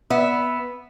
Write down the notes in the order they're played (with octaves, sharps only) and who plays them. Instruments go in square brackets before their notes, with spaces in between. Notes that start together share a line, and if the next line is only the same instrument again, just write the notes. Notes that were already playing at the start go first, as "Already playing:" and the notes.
[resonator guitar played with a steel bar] B3 E5